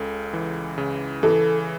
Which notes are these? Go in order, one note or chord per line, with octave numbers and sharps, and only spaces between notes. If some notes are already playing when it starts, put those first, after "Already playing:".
Already playing: C#2 C#3 A4
E3
C#3
E3 A4